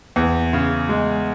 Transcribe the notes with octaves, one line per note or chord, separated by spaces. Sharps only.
E2
C#3
G#3